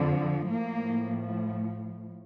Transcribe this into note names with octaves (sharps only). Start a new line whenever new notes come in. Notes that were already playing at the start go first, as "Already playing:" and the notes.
Already playing: F2 D3 F3
A2 F3 A#3